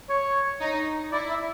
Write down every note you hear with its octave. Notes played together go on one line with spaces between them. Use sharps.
C#5
D#4
E4 D5
E5